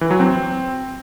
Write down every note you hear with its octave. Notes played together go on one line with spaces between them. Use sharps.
E3
F#3
C4